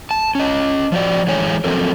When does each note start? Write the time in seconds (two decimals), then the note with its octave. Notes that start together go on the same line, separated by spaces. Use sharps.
0.11 A5
0.35 C#4 D#5
0.92 F3 F#4 D5
1.27 E3 G#3 C#5 G#5
1.64 F3 F#3 C4 A4 A#4